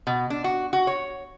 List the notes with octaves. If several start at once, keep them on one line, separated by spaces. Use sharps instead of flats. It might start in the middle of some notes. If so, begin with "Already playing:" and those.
B2
D4
F#4
F#4
C#5